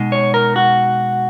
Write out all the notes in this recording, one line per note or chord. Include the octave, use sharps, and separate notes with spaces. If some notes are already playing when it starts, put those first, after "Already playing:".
Already playing: B2 G#3 D#4
C#5
A#4
F#4